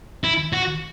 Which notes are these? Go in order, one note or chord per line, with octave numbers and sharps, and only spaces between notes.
E4
F#4